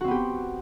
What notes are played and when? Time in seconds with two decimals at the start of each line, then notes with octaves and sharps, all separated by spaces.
0.01 F#4
0.04 C4
0.08 B3
0.11 G4